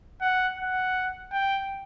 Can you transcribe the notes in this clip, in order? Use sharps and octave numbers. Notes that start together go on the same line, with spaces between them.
F#5
F#5
G5